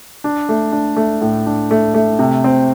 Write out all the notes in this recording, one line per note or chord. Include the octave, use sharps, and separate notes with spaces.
D4
A3
D4
A3
A2
D4
A3
A3
C3
C4